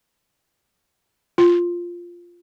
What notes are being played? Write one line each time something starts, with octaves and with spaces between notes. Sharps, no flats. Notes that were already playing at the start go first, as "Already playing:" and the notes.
F4